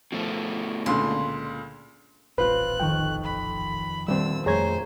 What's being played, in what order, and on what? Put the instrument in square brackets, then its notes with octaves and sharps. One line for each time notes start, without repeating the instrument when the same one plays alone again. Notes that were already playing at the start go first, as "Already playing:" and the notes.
[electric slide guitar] B2 A3 [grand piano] F3
[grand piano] C#2 A#2 D3 [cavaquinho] C6
[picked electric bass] D#1 A1 [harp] C4 F4 C5 [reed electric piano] B4 [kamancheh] F#6
[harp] F2 D#3 C#6 [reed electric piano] G5
[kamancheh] B5
[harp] D#1 D4 C5 [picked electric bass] G3 C4 [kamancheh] E6
[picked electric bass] F2 F3 A3 [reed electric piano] G#4 C#5 G#6 [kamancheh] C5 [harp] A#5